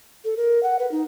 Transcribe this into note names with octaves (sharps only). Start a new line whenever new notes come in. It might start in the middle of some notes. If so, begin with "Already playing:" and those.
A4
A#4
F#5
B4
D#4